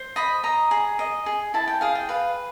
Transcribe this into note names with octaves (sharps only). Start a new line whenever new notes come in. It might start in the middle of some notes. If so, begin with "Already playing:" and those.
Already playing: C5
D#5 B5
D#5 A#5
G#4
D#5
G#4
E4 A5
G5
G#4 F5
G5
B4 F5